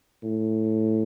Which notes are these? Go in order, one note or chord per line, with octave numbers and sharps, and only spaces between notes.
A2